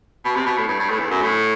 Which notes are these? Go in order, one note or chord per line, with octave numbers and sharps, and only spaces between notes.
B2
C3
B2
A2
G2
G2
A2
E2
F#2
A2